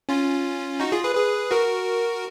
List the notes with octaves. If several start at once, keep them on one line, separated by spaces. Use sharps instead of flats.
C#4 F4
D#4 F#4
F4 G#4
G#4 B4
G#4 B4
F#4 A#4